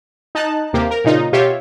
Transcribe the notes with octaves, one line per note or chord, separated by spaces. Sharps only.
D#4 A5 F#6
D#2 C3 A#3 G4
A#4
A#2 C#3 D#4 F4
B2 F4 G4 C#5 E5